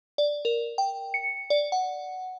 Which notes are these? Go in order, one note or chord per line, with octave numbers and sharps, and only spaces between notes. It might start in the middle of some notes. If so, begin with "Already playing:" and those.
D5
A#4
G5
C#7
D5
F#5